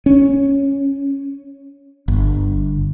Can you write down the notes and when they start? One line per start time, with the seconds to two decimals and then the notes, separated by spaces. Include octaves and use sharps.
0.06 C#4
2.08 G1